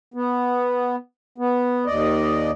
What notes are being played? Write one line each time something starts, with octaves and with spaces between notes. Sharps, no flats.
B3
B3
D#2 D5 D#5